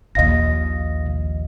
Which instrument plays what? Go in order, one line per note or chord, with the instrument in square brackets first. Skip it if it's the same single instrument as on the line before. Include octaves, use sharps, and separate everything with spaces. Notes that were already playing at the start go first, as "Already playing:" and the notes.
[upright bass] A#1 D#2 [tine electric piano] D#5 F5 A#6